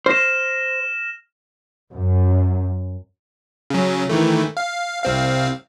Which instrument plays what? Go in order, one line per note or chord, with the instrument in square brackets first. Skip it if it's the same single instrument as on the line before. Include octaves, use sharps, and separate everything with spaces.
[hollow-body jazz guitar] C5 [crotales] F6 A#6 E7
[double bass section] F#2
[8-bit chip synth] C#3 F#3
D#3 E3 A3
F5
C2 C4 F5